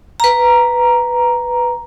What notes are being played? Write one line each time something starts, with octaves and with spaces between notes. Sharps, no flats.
B4 A#5